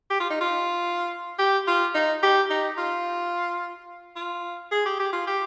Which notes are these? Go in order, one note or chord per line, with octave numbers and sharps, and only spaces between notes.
G4
F4
D#4
F4
G4
F4
D#4
G4
D#4
F4
F4
G#4
G4
G4
F4
G4